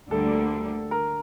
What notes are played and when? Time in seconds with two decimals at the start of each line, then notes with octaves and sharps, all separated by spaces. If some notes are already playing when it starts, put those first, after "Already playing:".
0.11 D2 D3 G3 A#3 A4
0.91 A#4